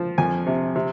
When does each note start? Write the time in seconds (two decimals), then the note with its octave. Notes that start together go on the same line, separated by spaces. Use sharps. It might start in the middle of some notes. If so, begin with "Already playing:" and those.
Already playing: F3
0.18 F2 G#5
0.47 C3
0.76 C3